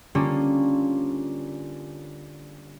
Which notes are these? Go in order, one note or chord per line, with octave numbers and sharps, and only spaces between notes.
D3 G3 A#3 C#4 F4